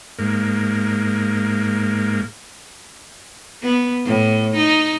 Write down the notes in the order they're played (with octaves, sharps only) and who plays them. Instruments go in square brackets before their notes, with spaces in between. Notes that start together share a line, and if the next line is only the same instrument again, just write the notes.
[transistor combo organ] G#2 A#3
[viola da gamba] B3
A2
D#4